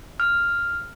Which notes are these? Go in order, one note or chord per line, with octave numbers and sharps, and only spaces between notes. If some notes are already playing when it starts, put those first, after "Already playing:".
F6